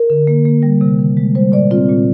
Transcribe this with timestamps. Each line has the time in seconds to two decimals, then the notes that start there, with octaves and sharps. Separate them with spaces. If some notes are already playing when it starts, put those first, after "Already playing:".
Already playing: A#4
0.10 D3
0.27 A#3
0.45 A#3
0.63 G3
0.81 C3
0.99 D#3
1.17 G#3
1.35 G3 C5
1.52 A#2 D5
1.71 C4 F4
1.89 A#2